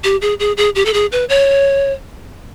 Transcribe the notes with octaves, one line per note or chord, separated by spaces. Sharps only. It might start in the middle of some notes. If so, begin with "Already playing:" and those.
G4
G#4
G#4
G#4
G4
A4
G#4
B4
C#5